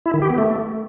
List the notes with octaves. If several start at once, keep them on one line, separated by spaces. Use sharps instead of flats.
E4
D#3
G4
B3
A3